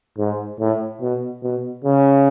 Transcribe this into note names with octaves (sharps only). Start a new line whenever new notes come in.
G#2
A2
B2
B2
C#3